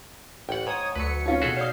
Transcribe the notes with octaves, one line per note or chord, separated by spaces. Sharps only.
A1 F#5 G5
G#2 C#5 D#6
D2 F#3 B4 C#7
C#4 D#4 F4 C#5 F5
B2 F#4 G#4 A4 B6
C#5 D5 F5 D#6 G6 C7